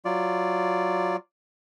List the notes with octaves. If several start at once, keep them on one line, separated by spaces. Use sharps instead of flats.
F#3 F4 D5